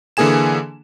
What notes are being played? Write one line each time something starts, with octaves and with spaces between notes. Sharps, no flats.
D3 E3 A#3 G#4 G#5 E7